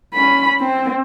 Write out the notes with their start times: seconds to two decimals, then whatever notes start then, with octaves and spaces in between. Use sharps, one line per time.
0.14 C#4 B5
0.60 C4